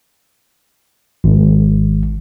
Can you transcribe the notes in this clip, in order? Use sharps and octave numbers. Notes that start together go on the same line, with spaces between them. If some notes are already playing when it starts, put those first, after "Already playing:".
G#1